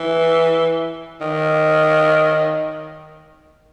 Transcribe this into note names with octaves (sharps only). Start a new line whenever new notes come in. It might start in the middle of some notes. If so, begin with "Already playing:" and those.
Already playing: E3
D#3